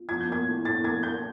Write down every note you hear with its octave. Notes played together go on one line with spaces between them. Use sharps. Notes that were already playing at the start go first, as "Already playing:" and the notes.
Already playing: F4
F3 G#6
G6
A#3 G#6
A2
A2 A6
A#3 G#6
A#3 G6